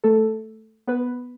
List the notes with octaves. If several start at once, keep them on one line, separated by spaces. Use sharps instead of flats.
A3 A4
B3 B4